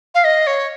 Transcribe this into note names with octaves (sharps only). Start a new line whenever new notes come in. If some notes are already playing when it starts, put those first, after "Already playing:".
F5
D#5
C#5